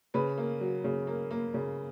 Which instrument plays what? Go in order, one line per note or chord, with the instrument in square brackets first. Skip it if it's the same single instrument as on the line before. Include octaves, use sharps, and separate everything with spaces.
[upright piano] C#3 B4
A#3
F#3
C#3
A#3
A#3
C#3